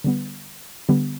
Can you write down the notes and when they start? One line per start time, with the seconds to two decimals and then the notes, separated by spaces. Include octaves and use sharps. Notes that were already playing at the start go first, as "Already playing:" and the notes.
0.04 D3 G3 B3
0.89 D3 G3 B3